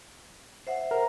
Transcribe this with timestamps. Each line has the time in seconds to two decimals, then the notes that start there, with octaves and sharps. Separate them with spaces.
0.67 C5 E5 F#5
0.91 A#4